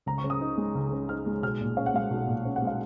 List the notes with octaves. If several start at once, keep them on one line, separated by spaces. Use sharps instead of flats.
C#2 A#5
C#6
C#3
D#6
D#4
G#3
C#2
C#3
D#4 F6
G#3
B1 F6
A#2
C#4 F5
F#5
G#3 F5
B1
A#2
C#4
F#5
G#3
F5